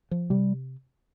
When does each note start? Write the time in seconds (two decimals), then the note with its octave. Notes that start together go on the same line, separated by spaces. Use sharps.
0.11 F3
0.30 C3 G3